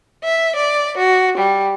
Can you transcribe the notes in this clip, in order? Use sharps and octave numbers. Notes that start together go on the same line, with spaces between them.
E5
D5
F#4
G3